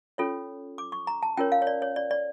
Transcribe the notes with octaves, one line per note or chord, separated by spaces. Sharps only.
C#4 F4 A4 C#5
D6
C#6
A#5
A5
C#4 F4 A#4 C#5 G5
F5
C#5
D5
C#5
D5
D5